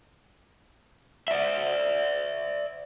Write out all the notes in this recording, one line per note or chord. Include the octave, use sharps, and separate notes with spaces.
D5 E5